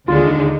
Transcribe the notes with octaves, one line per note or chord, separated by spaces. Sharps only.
D#2 D3 G#3 F4
D#4
D#4